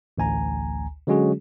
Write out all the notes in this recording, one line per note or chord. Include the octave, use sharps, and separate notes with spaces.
A1 D2 G#5 A#5
D3 F#3 G#3 C#4 F#4 G#4